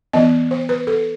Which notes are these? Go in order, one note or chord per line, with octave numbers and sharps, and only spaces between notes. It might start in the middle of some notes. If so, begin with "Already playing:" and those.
E3 B3 D#5
C5
B4
A4